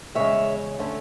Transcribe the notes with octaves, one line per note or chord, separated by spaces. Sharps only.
E2 C#3 G#3 C#5 E5
D3 A3 C#4